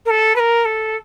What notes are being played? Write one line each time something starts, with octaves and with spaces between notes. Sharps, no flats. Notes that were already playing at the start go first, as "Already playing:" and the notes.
A#4
A4
B4
A#4
A4